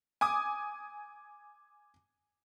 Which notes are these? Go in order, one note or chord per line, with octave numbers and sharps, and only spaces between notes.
G#5 D6 D#6